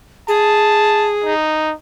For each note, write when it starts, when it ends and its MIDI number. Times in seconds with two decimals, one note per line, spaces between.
0.28 1.34 68
0.28 1.12 81
1.24 1.74 63